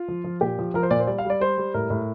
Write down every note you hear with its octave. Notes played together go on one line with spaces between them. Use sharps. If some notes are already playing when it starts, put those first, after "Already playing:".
Already playing: F4
F3
F3
A#2 G4
F3
F3 A#4
C5
A#2 D5
C5
G3 D5
F5
G3 D5
G3 C5
G3
A2 A#4
A2